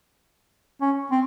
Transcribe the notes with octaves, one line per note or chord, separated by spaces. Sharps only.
C#4
C4